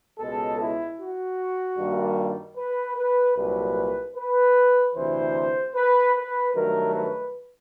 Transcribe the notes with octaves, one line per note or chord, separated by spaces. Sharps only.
C#2 B2 G#3 A4
E4
F#4
G2 D#3 G3 A#3
B4
B4
C2 A#2 F#3 B4
B4
D2 C3 E3 C5
B4
B4
G2 D#3 F#3 A3 A#4
B4